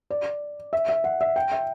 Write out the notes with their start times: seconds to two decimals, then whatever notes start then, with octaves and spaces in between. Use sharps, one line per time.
0.10 D5
0.73 E5
0.89 E5
1.04 F#5
1.21 E5
1.36 G5
1.52 E5